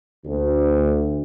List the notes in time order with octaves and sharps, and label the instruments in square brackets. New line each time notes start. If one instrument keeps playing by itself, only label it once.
[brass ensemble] D2